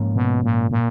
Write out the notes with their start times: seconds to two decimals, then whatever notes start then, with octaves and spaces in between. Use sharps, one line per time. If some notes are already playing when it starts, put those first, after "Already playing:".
Already playing: G#2 F3 A#3 C#4
0.16 B2
0.44 A#2
0.71 A#2